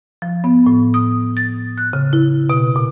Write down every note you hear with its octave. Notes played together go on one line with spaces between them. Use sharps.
F3
B3
A2
D#6
A6
F#6
C#3
E4
B2
A#2